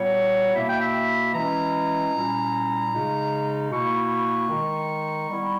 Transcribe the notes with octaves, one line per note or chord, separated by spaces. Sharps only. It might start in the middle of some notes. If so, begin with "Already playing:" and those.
Already playing: A#2 G3 B3 C#5
B2 A#3 E4 E5
G5
E5
E3 G#3 C#4 E4 A#5
A#2 G3 C#4 E4
C#3 G#3 D#4
B2 A#3 E4 C#6
D#3 G#3 D#4
G3 B3 E4